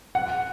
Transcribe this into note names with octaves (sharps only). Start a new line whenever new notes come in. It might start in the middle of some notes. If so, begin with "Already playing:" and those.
F#5